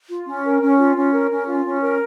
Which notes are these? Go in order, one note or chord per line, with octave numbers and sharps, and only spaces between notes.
F4
C#4
A#4
C#4
F4
C#4
A#4
C#4
F4
C#4
A#4